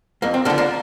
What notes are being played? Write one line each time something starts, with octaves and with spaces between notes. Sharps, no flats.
F2 A#3
C4
D3 F3 A#3 D4
A#3 D4